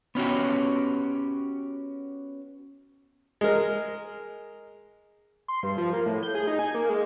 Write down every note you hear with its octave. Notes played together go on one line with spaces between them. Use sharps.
B3 C#4 F#4 G4
G#3 A#4
C6
G2
F3
A#3
A2
G6
G#4
D#4
G#5
A#3
G#3